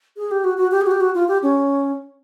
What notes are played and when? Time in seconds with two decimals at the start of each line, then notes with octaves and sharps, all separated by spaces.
0.17 G#4
0.31 G4
0.44 F#4
0.57 F#4
0.71 G4
0.81 G#4
0.86 F#4
0.91 G4
1.00 F#4
1.15 F4
1.28 G4
1.43 C#4